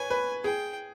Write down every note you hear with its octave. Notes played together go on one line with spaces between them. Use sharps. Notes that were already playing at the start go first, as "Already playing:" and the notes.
Already playing: B4 C#5 G#5
B4
G#4 G5